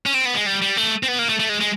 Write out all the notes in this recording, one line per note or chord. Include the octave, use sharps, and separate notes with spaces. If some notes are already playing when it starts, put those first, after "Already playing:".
C#4
C4
B3
G#3
G3
G3
A3
C4
B3
A#3
A3
A3
G#3
G#3